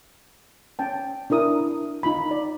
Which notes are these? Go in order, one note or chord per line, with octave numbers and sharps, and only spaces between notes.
C#4 G5 A5
D4 E4 A#4 D#6
D#4 F4 B5
D5